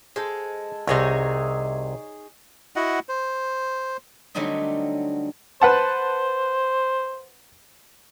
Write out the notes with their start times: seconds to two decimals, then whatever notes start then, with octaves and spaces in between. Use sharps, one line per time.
0.16 G#3 A4 C5
0.87 C2 C3 D#4 G#4 C#5
2.76 E4 F#4 D#5 F#5
3.09 C5
4.35 D3 F#3 G3 A3 C4 D#4
5.61 B4 C5 F#5 A5